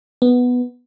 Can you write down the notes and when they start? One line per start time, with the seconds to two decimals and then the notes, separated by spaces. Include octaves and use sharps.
0.22 B3